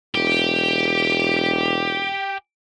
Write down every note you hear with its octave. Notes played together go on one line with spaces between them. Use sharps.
E1 G4